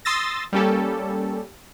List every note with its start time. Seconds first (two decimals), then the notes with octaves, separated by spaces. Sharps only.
0.05 C6 D#6 E6 A6 A#6
0.53 G3 A#3 C#4 G4 A4